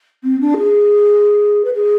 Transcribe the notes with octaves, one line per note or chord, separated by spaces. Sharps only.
C4
D4
G#4
B4
G#4